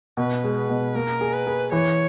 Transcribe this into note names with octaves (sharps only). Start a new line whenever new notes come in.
B2 B4
G#3
B4
B2
A#3 A#4
G#4
B4
G#4
E3 C#5